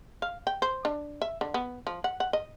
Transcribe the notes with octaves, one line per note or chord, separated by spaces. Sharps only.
F5
G5
C5
D4
E5
D3
B3
F3
F#5
F#5
D#5